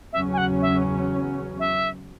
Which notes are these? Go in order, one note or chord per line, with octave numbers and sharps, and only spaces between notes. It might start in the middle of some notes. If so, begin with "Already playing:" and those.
E2 C#3 F#3 C#4 E5
G#5
F#5
E5
E5